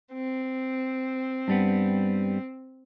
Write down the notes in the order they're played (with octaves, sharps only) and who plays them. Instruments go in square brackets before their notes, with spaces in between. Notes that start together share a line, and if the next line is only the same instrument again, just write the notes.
[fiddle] C4
[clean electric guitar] G2 G3 B3